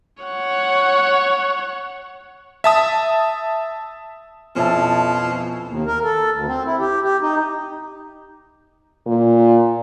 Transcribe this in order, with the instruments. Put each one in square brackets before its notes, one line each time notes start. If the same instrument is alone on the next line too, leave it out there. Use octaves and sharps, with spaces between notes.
[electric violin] C#5 F#5
[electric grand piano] E5 A5 D#6
[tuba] F2 [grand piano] B2 [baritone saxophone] F3 [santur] C#4 E4 A5
[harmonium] D#2
A#4
A4
D2
C4
E4
G4
G4
D#4
[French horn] A#2